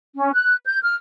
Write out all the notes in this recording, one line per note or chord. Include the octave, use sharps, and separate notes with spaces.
C#4
F#6
G6
F6